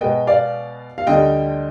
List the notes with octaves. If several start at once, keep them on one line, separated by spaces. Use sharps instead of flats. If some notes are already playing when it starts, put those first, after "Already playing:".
B2 G#3 B3 D#5 G5
D5 F5
F5
D2 D3 G3 D#5 G5